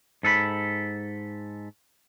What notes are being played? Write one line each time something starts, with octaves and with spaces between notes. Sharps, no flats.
G#2 A4 B4 B5